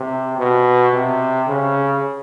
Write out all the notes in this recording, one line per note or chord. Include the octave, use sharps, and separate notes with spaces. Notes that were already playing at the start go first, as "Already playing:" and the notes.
Already playing: C3
B2
C3
C#3